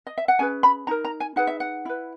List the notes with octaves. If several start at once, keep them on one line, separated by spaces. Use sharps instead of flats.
D#5
E5
F#5
C#4 G#4 B4 G#5
B5
D#4 A#4 A#5
A#5
G#5
D#4 G#4 B4 F#5
E5
F#5
E4 B4